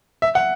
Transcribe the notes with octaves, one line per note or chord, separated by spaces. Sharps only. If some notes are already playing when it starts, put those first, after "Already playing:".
E5
F#5